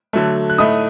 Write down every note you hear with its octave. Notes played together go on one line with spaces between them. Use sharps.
D3 F#3 A3
F#6
A2 A3 D#4 D#6